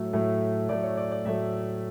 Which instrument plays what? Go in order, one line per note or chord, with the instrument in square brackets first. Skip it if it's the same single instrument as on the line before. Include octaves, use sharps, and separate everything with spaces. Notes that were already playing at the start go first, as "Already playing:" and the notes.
Already playing: [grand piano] A2 F#3 A3 A4
A2 F#3 A3
A2 F#3 A3 D5
C#5
D5
D5
A2 F#3 A3 E5